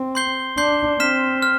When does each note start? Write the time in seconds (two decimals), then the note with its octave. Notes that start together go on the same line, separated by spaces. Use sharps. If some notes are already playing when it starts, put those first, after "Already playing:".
Already playing: C4
0.15 C6 G6 C7 G7
0.58 D4 C6 G6 C7 G7
1.00 C4 F6 B6 E7
1.42 F6